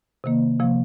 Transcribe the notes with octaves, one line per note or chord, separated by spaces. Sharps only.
C3 D#3 A#3
C3 F3 A#3